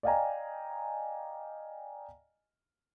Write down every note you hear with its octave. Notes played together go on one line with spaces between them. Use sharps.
D5 D#5 F5 G5 G#5 A#5